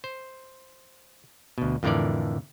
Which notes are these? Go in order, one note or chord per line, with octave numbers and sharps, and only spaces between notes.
C5
D2 B2
F2 A2 D3 E3 A#4 D5